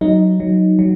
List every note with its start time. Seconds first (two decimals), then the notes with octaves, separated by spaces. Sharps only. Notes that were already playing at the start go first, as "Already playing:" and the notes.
0.01 F#3 D#4
0.40 F#3
0.79 F#3